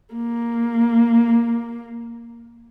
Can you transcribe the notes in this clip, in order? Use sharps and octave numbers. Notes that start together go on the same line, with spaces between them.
A#3